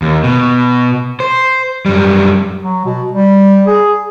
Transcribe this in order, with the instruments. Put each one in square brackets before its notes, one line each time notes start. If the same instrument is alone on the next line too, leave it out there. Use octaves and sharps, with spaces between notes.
[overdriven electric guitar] D#2
B2
C5
F#2 G3
[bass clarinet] F#3
B2
G3
G#4